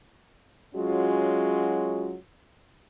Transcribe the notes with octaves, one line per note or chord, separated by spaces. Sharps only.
F#3 G#3 C#4 F4 F#4